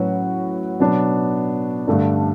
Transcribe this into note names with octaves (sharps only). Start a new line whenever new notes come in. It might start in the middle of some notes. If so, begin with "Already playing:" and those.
Already playing: A2 F#3 C#4 F#4 B4
B2 F#3 B3 D4
G2 D3 A3 D4